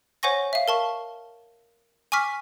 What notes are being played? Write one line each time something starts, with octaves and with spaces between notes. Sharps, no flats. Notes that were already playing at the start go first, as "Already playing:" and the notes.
C5 C#5 F#5 G#5 C#6 A#6
E5 F5
A#4 A5 C#6
G#5 C#6 D6 F6 B6